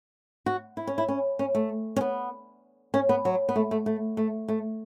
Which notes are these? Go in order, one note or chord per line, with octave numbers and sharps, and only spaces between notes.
F#4
E4
C#4
E4
C#4
C#4
A3
C#4
B3
C#4
B3
F#3
B3
A3
A3
A3
A3
A3